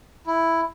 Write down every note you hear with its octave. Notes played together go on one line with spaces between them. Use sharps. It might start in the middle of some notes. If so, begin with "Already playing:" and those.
E4